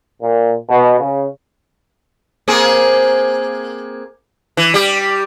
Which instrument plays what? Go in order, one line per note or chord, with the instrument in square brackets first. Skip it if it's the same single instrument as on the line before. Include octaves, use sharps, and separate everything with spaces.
[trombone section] A#2
B2
C#3
[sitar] A#3 C4 G#4
E3
G3 G4